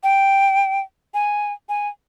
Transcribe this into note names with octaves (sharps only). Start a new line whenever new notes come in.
G5
G#5
G#5